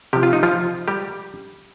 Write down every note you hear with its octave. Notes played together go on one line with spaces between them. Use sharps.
C3 F3 G4
F4
D#4
F3 F4
G3 G4